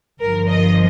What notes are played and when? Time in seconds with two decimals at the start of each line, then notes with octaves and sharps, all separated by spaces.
0.20 G1 G2 F3 A#4
0.49 D#5